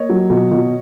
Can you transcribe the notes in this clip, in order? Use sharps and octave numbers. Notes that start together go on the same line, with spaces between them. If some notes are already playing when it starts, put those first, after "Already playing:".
Already playing: A#3 C#5 D#5
F#3
B2
B2